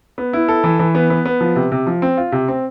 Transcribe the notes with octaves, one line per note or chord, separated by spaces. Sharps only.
B3
E4
A4
E3
E3
B3
B3
B3
F3
C3
C3
F3
C4
F4
C3
C4